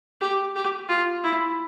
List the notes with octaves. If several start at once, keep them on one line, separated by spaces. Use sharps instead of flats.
G4
G4
F4
E4